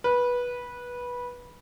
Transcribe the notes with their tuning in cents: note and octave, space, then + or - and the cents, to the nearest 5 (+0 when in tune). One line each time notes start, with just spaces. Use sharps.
B4 -15